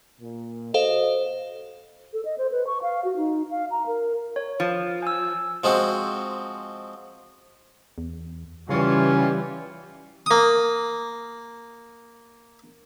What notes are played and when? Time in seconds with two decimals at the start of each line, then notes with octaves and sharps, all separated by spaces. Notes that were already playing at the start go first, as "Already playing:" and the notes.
0.21 A#2
0.74 F#4 A4 C5 D#5 F5
2.13 A4
2.25 D#5
2.38 C5
2.52 B4
2.67 C#6
2.82 F5
3.04 F#4
3.17 D#4
3.51 F5
3.71 A#5
3.86 A#4
4.36 C#5
4.60 F3
5.02 G#5 E6
5.64 F3 G#3 C4 F#4
7.98 E2
8.69 C#3 E3 G3 C#4 F4
10.26 A#3 D#6